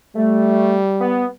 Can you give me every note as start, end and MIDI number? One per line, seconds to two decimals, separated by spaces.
0.16 1.36 55
0.16 0.76 57
1.01 1.26 59